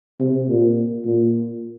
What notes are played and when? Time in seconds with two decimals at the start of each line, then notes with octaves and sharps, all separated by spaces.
0.20 C3
0.49 A#2
1.06 A#2